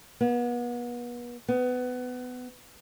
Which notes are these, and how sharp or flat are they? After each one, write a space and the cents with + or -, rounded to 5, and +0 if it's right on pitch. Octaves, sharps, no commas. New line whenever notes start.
B3 -35
B3 +20